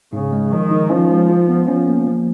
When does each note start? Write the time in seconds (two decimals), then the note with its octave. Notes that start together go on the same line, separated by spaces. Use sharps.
0.13 G#2 C#3
0.32 G#3
0.52 D#3 F3
0.71 D#4
0.90 F3 C#4
1.10 G#3
1.30 F4
1.48 B3
1.68 F3 C#4
1.87 A#3
2.07 F3